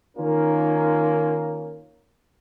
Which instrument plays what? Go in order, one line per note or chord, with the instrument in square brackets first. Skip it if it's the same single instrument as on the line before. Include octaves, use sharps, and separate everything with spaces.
[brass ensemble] D#3 A#3 C#4 F4 A#4